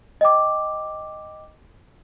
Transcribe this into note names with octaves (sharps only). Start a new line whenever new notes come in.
D#5 G5 D6